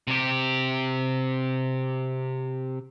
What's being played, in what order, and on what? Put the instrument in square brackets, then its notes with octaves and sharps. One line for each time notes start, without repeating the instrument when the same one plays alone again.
[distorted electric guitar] C3 G4